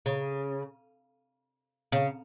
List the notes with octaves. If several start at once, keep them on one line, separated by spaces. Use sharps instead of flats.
C#3
C#3